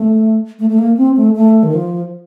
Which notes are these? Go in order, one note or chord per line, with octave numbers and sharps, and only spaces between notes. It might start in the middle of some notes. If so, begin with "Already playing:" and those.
Already playing: A3
A3
A3
A#3
C4
A3
A3
D#3
F3